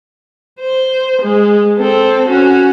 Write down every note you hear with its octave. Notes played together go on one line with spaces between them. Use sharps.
C5
G#3
C4 A4
C#4 F#4